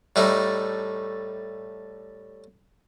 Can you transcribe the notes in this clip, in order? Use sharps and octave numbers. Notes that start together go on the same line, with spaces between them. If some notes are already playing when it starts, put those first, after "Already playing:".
A2 G3 A3 D#4